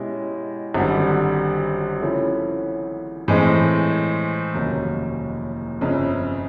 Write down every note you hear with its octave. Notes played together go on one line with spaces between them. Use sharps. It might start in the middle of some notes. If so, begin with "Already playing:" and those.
Already playing: B2 G#3 C#4 E4 G4
G#1 F#2 D3 G3
C#3 F3 A3 C#4 E4
A2 E3 G#3 C4
F1 D#2 C#3 F#3 A#3
G1 F2 C#3